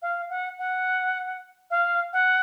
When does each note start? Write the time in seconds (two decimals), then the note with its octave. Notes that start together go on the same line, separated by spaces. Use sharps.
0.02 F5
0.30 F#5
0.59 F#5
1.70 F5
2.13 F#5